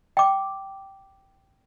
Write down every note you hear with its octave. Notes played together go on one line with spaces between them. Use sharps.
G5 D6